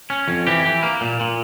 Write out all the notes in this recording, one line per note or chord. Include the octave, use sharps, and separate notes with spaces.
C#4
F2
E3 G4
E3
A#3
A#2
A#2